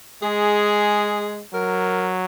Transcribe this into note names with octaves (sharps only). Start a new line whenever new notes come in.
G#3 G#4
F#3 A#4